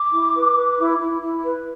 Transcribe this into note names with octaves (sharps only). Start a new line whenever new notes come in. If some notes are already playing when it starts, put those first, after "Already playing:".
Already playing: D6
E4
B4
B4
E4
E4
E4
B4